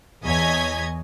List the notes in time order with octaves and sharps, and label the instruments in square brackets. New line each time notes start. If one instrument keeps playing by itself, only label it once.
[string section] E2 C#5 D#5 G#5 G#6 B6